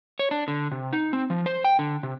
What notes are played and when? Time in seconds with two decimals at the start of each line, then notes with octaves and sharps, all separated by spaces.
0.19 C#5
0.31 D4
0.48 D3
0.72 C3
0.93 D#4
1.13 C4
1.30 F3
1.46 C5
1.65 G5
1.79 D3
2.03 C3